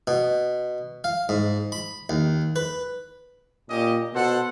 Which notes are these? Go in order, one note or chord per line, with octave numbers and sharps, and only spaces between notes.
B2
F5
G#2
B5
D#2
B4
A#2 C#4 G4 D#5
B2 A4 C5 F#5